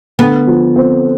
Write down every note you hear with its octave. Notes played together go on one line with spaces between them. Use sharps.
D3 B3
F3
C4